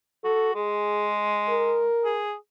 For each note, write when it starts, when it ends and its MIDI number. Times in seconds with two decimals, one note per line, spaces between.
0.24 0.53 66
0.24 0.54 69
0.55 1.87 56
0.55 1.15 68
1.49 2.22 70
2.05 2.34 68